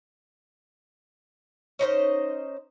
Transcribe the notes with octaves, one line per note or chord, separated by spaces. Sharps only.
C#4 D#4 C5 D#5